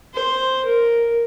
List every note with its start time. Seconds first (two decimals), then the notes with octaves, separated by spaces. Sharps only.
0.14 C5
0.65 A#4